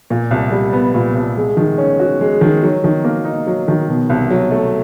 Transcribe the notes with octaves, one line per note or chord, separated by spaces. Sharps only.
A#2
C2
G3
B3
A#2
C2
G#3
D#3
C#4
F#4
G#3
D#3
F#3
D#3
A#3
D#4
F#3
D#3
B2
C2
F#3
A3